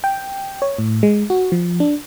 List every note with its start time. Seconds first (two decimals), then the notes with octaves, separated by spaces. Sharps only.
0.04 G5
0.62 C#5
0.78 A2
1.03 G#3
1.30 F#4
1.52 F3
1.80 D4